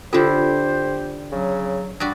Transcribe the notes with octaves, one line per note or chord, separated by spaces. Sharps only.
D3 D4 E4 F4 G4 A4 C5
C#3 F#3
G2 F#4 D5